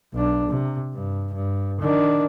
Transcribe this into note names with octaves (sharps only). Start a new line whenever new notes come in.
B1 D4
C3
G2
G2
D#3 D4